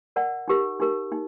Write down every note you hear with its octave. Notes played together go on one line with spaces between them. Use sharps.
A#4 D5 F#5 A5
D#4 G4 A#4
D#4 G4 A#4
D#4